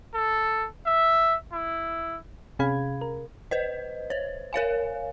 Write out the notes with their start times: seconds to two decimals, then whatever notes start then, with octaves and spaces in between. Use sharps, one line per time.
0.14 A4
0.86 E5
1.52 E4
2.59 C3 C#4 G#4 F5 B5 G#6
3.01 A#4
3.51 B4 C5 D#5
4.10 C5 C#5
4.53 A#4 C#5 F5 G#5